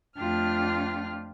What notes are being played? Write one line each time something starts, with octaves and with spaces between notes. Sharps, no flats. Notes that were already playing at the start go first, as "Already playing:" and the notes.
F2 A3 D4 F4 G4 F6